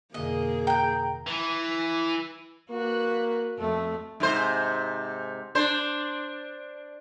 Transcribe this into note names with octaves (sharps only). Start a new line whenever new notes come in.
F2 B2 D3 A#3 G#4 D#5
G5 A#5 G6
E3
A#3 F#4 B4
F2 A3
G#2 C3 C5
D4 C5